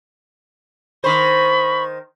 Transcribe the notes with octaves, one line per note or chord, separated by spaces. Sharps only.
D#3 C5 B5 C#6